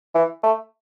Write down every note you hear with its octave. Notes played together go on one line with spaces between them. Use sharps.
E3
A3